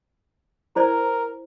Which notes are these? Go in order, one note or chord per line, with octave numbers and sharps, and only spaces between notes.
E4 A#4 C5 D5